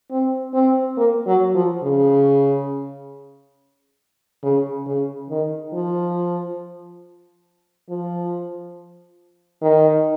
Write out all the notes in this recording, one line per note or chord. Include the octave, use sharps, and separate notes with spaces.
C4
C4
A#3
F#3
F3
C#3
C#3
C#3
D#3
F3
F3
D#3